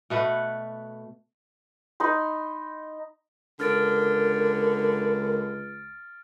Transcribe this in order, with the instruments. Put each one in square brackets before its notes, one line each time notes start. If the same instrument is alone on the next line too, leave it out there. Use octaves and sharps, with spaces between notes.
[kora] B2 A3 B4 F#5
[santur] D#4 B5 C6
[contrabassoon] C#2 [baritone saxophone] D3 [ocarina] A#4 [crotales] F6 A6 D7